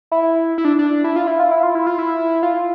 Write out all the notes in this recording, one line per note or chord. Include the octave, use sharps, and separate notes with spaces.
E4
E4
D4
D4
E4
F4
E4
F4
E4
F4
E4
F4
E4
F4